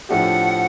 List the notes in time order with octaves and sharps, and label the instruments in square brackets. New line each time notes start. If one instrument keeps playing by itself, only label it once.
[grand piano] A2 F3 A3 D4 G4 [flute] F#5